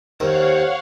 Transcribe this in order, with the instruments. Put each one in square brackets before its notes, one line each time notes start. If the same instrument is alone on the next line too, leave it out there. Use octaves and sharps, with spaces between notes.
[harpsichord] D#2 [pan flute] C5 [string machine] C#5 F5 F#5